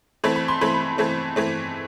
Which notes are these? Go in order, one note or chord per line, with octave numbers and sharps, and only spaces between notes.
E3 A3 C4 B5
B5
C6
E3 A3 C4 B5
E3 A3 C4
E3 A3 C4